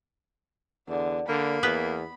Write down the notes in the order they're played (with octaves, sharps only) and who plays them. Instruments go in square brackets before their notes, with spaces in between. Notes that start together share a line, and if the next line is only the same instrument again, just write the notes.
[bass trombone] E2 [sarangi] D3
[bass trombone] D3 [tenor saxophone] A#3 [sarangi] B5
[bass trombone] E2 [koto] B3 B4